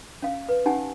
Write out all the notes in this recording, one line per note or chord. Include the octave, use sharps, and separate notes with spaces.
C#4 F5
B4
C#4 D#4 G4 F#5 G#5 A5